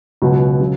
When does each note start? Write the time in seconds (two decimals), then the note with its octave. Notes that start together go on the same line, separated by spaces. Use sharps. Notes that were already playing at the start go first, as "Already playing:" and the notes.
0.22 C#2 B2 F#3 F#4
0.60 C#3 F#3